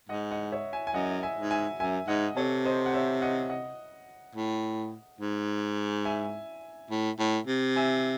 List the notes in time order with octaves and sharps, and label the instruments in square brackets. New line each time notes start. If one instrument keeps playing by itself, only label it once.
[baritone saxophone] G#2 [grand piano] D#5 F#5
[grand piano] D#5 F#5
C#5 E5
E5 G#5
G#5
[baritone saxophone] F#2 [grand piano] D#5 F#5
[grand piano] E5 G#5
[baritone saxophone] G#2
[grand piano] E5 G#5
[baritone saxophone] F#2 [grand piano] E5 G#5
[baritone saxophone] G#2 [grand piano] D#5 F#5
[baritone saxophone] C3 [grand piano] A4 C#5
[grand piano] C5 D#5
F#5
C#5 E5
D#5 F#5
D#5 F#5
[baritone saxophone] A2
G#2
[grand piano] E5 G#5
[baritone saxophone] A2
A2
C3
[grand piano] E5 G#5